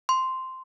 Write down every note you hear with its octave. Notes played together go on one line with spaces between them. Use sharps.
C6